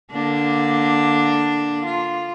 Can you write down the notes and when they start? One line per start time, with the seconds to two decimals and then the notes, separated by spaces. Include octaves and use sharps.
0.11 D3 A#3 D4
1.85 F4